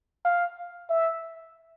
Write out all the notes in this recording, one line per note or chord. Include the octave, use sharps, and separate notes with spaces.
F5
E5